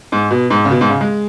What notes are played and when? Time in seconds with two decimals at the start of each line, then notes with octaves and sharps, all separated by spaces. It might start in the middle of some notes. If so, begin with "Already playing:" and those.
0.12 G#2
0.31 B2
0.50 G#2
0.65 C#3
0.71 B2
0.81 G#2
0.90 C#3
1.01 G#3